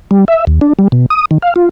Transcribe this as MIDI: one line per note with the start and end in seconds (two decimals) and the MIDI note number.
0.11 0.25 55
0.28 0.45 76
0.47 0.59 39
0.61 0.73 62
0.79 0.88 55
0.92 1.06 47
1.10 1.25 87
1.31 1.38 51
1.42 1.54 77
1.56 1.69 65